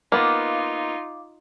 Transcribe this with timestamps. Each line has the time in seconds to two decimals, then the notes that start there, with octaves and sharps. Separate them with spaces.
0.12 A#3 B3 D#4 F4 F5 D6